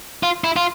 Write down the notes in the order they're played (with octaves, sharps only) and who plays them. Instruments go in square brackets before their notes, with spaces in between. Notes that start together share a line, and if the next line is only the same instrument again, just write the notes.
[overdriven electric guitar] F4
E4
F4